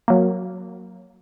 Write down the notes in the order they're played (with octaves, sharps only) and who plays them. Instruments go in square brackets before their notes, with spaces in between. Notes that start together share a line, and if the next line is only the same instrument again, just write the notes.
[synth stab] F#3 A#3